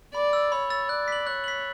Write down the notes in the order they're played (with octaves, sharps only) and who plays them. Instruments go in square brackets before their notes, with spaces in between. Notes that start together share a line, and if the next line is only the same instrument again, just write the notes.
[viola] D5 [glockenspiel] B5
[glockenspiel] E6 A6
[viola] C#5 [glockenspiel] B5
[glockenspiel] E6 A6
[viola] D5 [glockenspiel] F#6
[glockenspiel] B6 F#7
[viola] C#5 [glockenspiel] F#6
[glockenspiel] B6 F#7